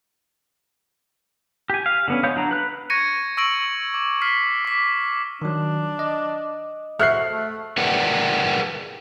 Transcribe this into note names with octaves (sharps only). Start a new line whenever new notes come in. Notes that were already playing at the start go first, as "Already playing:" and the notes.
G4 G#5
F5
D3 B3 C#4
G#3 B3 C#5 F5 G6
F#3 D4 A#5
B4 F#6
C#6 G#6 A#6 C#7 D#7
C#6 E6 A#6 D7 F#7
D6
F6 B6 C7
D6 B6
D#3 F#3 D4
D#5
F#4 A4 C5 E5 F6 F#6 C7
A3
G#4 A#4 B4 D5 F#5 G5